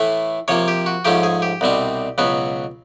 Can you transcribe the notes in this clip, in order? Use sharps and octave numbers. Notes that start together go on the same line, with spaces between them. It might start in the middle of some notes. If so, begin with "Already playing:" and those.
Already playing: A2 E3 A3
C3 F3 A#3 C#5
G4
F#4
G#2 F3 A3 C#4 G4
G#4
G4
C2 B2 G3 C4
C#2 B2 F#3 B3